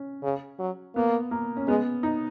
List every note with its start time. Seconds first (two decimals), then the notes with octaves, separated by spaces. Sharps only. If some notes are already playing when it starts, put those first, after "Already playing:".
Already playing: C#4
0.23 C#3
0.59 F#3
0.96 A#3 B3
1.31 A#3
1.57 C#4
1.68 G#3 B3
2.03 D#4